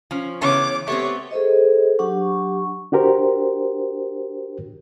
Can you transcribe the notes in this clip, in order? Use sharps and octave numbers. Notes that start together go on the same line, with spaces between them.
F3 C#4
C#3 E3 B3 C#5 D6
A3 B3 C4 G4 C#5
G#4 A4 C5 D#5
F#3 D4 G4 F#5 C#6
D4 F#4 G4 A#4 C5